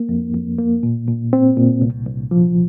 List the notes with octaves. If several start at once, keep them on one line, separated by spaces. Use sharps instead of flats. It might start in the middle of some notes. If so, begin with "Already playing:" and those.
Already playing: A#3
F2
F2
A#3
A#2
A#2
C4
A#2
C2
C2
F3